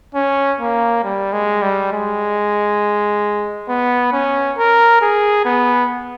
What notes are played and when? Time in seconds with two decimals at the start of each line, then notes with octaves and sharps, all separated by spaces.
0.15 C#4
0.60 A#3
1.04 G3
1.33 G#3
1.62 G3
1.92 G#3
3.69 B3
4.13 C#4
4.58 A#4
5.02 G#4
5.45 B3